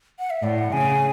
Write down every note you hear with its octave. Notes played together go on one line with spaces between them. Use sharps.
F#5
E5
A2 D5
F#5
C#3 G#5